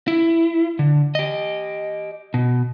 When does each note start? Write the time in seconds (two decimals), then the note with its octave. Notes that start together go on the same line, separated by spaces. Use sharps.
0.08 E4
0.79 D3
1.15 G4 D#5
2.34 B2